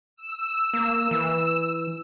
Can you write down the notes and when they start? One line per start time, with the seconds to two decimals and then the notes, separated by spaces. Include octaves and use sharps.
0.16 E6
0.74 A#3
1.11 E3